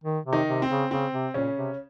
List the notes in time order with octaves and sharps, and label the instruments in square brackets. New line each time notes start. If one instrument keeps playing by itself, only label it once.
[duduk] D#3
C3
[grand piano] D#3 D#4
[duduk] C3
[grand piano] C4
[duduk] C#3
[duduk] C#3 [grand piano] C4
[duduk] C3
[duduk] A#2 [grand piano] C#3 C#4
[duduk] C3